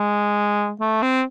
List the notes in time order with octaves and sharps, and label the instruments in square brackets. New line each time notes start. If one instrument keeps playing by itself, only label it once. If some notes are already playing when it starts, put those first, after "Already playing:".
Already playing: [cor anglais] G#3
A3
C4